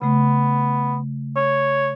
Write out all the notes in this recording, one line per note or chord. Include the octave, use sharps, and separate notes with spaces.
C#3 A3 B3
C#5